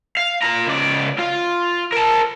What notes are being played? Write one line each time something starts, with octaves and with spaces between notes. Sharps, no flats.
F5
F4 A#5
C#2 D5
F4
A#4 A5